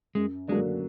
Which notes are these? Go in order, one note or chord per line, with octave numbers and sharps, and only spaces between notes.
F#2 G#3
D3 F#3 G#3 A#3 D4